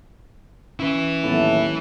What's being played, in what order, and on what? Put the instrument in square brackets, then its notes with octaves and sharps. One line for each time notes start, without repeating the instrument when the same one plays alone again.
[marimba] C#4 [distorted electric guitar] E4 B4
[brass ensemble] D#2 A3 [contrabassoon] A2 [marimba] F#3 B3